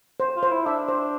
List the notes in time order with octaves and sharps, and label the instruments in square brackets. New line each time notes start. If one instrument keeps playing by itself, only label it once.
[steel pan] C5
[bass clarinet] F4
[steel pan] C5
[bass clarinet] E4
[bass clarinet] D4 [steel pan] E5
[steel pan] C5